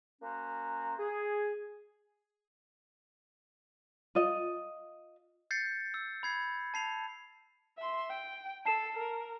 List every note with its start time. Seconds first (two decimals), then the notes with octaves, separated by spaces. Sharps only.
0.22 A#3 C#4 F#4 C5 A#5
0.98 G#4
4.15 F4 D#5
5.51 G6 A6 C7 C#7
5.94 E6
6.23 B5 G#6 C7
6.74 A5 C7 F7
7.78 E5 C6
8.09 G5
8.66 A4 A5 C7 E7
8.97 A#4